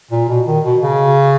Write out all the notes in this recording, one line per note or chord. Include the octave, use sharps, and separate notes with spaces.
A#2
B2
D#3
B2
C#3